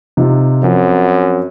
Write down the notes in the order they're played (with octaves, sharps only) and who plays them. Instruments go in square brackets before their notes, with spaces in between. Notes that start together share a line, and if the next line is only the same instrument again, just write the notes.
[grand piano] C3 D#4 F4
[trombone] F#2 [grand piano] F3 C4